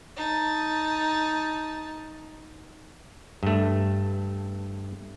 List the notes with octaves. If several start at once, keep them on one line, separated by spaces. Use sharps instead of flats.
D#4 A5
G2 A3